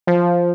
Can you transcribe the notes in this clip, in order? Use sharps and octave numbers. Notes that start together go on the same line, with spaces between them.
F3